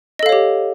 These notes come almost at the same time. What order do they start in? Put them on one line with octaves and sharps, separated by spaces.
D#5 A4 F5 C#5 G4